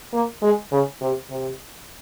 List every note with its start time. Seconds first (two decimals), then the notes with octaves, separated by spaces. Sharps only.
0.13 A#3
0.42 G#3
0.72 C#3
1.01 C3
1.31 C3